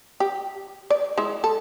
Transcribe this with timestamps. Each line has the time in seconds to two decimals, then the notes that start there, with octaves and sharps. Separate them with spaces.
0.20 G4
0.90 D5
1.18 G#3 E4
1.44 A4